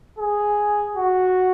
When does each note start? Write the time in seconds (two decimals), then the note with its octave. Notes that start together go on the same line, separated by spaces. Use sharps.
0.19 G#4
0.96 F#4